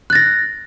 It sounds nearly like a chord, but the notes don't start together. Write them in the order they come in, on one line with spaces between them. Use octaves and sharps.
F#6 A6 A#6